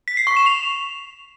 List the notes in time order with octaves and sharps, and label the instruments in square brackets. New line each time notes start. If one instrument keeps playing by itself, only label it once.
[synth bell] B6
C7
C#6
E7
F7